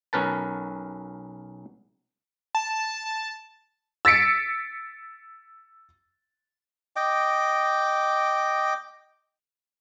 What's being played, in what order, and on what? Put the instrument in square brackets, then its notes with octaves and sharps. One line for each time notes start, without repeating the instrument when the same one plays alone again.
[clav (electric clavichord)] B1 C#4 A#4 B4 A5
[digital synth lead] A5
[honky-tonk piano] E6 A6 B6 C#7 D7
[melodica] D#5 G5 D6